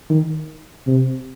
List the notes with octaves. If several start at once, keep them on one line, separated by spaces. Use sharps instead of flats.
D#3
C3